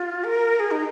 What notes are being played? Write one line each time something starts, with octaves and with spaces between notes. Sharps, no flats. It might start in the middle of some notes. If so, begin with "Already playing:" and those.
Already playing: F4
A#4
G#4
D#4